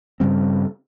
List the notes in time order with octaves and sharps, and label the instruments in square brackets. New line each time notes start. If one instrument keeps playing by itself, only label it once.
[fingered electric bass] G2 C#3 G3 C4